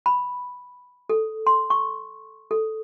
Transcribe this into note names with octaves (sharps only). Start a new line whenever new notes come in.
B5
A4
C6
C#6
A4